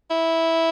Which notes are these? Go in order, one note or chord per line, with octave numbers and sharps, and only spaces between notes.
E4